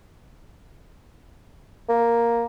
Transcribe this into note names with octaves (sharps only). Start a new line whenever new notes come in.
A#3